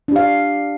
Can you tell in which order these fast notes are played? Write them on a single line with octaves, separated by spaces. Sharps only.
D4 G4 F5